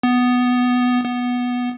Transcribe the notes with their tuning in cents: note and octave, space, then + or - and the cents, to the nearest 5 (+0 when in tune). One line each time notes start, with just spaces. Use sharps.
B3 +5
B3 -5